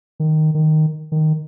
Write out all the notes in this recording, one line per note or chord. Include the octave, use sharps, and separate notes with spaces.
D#3
D#3
D#3